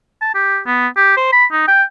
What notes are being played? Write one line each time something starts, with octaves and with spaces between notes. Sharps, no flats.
A5
G4
B3
G4
C5
B5
D#4
G5